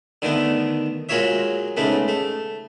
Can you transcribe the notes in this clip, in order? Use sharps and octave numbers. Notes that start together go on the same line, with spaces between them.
D3 D#3 A3 B3
F#3 G#3 A#3 F4 C#5 E5
G#2 C#3 A3 B3
A3